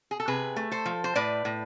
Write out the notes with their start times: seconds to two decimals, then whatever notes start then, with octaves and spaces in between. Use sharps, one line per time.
0.11 G#4
0.20 A4
0.28 C3 G#4 B4
0.56 A3
0.71 A4 C5
0.85 F3
1.04 C5
1.15 A2 B4 D5
1.45 A2